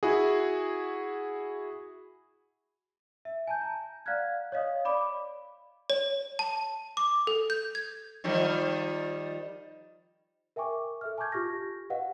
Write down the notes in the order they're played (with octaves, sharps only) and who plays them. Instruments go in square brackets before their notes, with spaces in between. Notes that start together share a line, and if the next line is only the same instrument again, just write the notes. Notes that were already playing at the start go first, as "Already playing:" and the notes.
[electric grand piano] E4 F#4 G#4
[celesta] E5
G#5 A5 G6
A#5
D5 F5 F#5 F6 F#6 G#6
C#5 D#5 F5 D#6
D5 B5 D6
[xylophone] C#5
A5
D6
A4
G6
G#6
[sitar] D#3 F3 G3
[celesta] A#4 E5 G5 G#5 C#6 D6
A4 E5 F6
G#5 A5 C#6 D6 G6 G#6
F4 G4 C#6 F6 A#6
G4 B4 D#5 F5 F#5